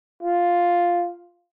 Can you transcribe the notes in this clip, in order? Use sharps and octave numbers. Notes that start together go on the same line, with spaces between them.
F4